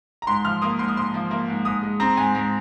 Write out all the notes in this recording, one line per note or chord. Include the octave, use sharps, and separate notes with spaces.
A#5
G#2 C6
F3 F6
A#3 D#6
G#2 C6
D#6
G#2 C6
F3
A#3
G#2
G#2 D#6
G#3
C4 A#5
G#2 G#5
G#2